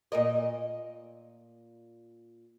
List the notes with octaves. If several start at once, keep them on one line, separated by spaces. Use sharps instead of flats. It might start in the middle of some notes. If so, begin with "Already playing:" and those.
A#2 A#4 D#5